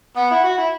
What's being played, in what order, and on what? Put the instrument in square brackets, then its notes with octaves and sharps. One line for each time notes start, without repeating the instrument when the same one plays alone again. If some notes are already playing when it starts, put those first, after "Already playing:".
[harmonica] B3 [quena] F#5
[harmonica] E4
F#4
E4